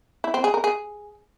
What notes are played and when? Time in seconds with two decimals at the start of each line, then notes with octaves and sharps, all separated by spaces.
0.24 E4
0.34 C4
0.44 G#4
0.54 A#4
0.64 G#4